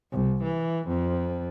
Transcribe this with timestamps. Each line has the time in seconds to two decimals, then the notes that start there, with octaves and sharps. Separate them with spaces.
0.12 C2
0.43 E3
0.88 F2